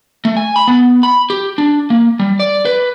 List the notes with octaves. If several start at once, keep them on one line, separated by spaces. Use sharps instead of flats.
A3
G#5
B5
B3
B5
G4
D4
A#3
G3
D5
B4